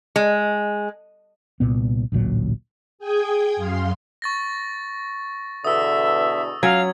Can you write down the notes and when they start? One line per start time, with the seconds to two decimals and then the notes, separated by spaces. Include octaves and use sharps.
0.16 G#3
1.60 C2 A#2 B3
2.12 A1 D2 A#2 F#3
2.99 G#4 G5 D#6 G#6
3.56 F#2 F5 C6
4.22 C#6 A6 A#6
5.65 E2 B2 D3 E5 D#6 E6
6.63 F#3 C#4 F5 G#6